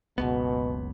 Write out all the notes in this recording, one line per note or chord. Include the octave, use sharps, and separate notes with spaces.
F#1 C#2 B2 B3